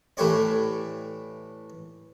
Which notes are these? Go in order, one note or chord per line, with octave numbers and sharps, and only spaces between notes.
A2 E3 A3 G4 C#5 D5